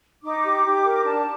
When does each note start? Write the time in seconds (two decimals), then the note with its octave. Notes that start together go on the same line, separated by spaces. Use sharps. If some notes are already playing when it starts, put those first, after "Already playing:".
0.23 D#4 D6
0.44 G4
0.64 G4
0.84 A#4
1.05 D4 A5